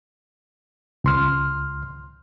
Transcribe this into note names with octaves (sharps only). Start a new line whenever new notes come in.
C#2 C6 F6